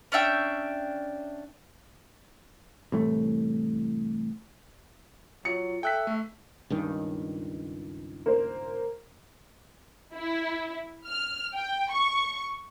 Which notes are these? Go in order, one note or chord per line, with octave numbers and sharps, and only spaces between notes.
C#4 D4 E5 G5
C2 A2 E3 A3
F#3 F4 C#7
A4 E5 G5 F#6 B6
A3
C#2 G2 D#3
A#3 C5
E4
F6
G5
C#6